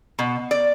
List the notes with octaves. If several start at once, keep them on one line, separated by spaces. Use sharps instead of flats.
B2
D5